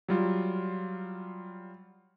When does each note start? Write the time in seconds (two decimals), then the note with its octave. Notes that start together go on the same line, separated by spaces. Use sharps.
0.08 F#3 G3 F4